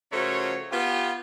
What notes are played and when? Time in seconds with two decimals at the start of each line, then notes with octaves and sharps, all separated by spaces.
0.12 C#3 F3 A3 F#4 A#4 C#5
0.72 B3 F4 G4